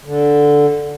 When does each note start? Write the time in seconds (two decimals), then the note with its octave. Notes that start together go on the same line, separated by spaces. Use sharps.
0.05 D3